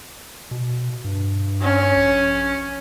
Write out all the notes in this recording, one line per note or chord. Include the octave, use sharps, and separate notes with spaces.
B2
G2
C#4
A#1